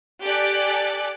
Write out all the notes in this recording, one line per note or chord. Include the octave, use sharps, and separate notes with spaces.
G4 A4 D5 G#5 D6 F#6